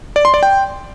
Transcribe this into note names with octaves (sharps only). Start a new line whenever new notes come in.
D5
C6
D5
G5